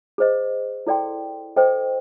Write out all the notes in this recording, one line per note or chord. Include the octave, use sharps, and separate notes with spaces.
G#4 C5 D#5
E4 A4 D5 G5 C6
A4 C5 D#5 G5